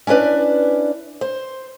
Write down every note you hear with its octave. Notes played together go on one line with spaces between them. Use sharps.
C#4 D4 E4 B4 D5
C5